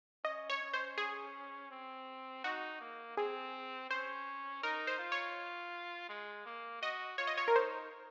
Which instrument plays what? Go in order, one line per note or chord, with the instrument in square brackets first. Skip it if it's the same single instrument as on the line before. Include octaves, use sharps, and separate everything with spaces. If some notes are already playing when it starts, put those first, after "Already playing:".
[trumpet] C#4 [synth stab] D#5
[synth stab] C#5
[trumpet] C#4
[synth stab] C5
G#4
[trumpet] C4
[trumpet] D#4 [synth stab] F#4
[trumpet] A#3
[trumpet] C4 [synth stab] G#4
[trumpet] C#4 [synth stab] C5
[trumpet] D#4 [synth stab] A#4
[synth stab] C5
[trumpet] F4
[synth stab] C#5
[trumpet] G#3
A#3
[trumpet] F#4 [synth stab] D#5
[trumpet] F4 [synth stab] C#5
[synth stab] D#5
C#5
A#4
[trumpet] D#4 [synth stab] C5